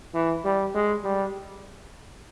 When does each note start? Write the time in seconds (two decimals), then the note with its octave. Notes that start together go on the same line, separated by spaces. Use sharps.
0.14 E3
0.45 G3
0.74 G#3
1.04 G3